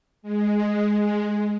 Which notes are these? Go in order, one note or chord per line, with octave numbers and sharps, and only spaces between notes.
G#3